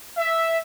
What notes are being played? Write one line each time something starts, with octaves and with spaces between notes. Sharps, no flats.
E5